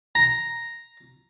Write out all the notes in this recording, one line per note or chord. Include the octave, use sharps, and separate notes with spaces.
A#5